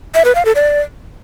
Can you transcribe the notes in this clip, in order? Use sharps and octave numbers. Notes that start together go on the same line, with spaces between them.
E5
B4
F5
A4
D5